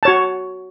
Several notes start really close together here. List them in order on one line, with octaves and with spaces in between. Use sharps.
A5 C#5 F#4